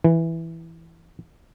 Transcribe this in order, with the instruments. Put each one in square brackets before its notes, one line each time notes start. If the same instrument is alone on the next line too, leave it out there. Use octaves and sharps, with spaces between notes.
[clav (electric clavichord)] E3